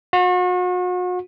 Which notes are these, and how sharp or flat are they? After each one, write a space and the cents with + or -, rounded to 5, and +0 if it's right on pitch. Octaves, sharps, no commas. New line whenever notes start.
F#4 -40